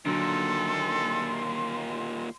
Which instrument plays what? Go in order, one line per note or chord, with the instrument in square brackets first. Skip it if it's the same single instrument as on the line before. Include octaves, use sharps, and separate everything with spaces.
[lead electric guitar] D#2 A#2 [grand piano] D3 F#3 [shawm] A4 [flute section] C6